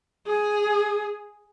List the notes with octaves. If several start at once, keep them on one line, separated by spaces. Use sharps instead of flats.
G#4